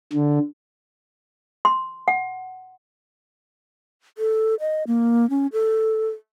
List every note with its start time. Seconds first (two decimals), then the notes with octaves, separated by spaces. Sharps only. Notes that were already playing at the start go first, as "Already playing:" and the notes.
0.13 D3
1.65 C6
2.08 F#5
4.18 A4
4.60 D#5
4.87 A#3
5.30 C#4
5.53 A4